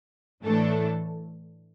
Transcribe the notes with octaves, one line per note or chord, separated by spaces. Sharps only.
A2 E3 A3 D4 A4